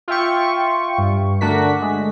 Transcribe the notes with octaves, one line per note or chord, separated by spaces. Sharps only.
F4 E5 G5 C#6
G2
D3 A3 D4 F#4 A#4 B6
G#3 A3